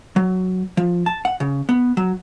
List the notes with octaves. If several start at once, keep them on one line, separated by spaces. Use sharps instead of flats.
F#3
F3
A5
F#5
C#3
B3
F#3